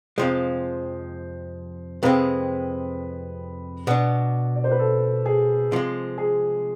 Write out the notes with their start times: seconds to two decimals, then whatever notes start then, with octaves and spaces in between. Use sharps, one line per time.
0.18 F2 C3 F3 G#3 C5
2.03 F2 C3 G#3 C4 B4
3.87 B2 B3 D4
4.56 D5
4.64 C5
4.71 B4
4.79 A4
5.25 G#4
5.72 C3 F3 G#3
6.18 G#4